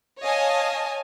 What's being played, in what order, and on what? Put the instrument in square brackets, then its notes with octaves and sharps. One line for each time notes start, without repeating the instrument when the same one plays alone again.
[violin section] C#5 D#5 F5 G#5 A5